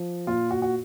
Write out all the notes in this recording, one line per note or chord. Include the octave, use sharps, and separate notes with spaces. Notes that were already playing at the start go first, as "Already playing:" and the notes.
Already playing: F3
A#2 F4
F#4
F#4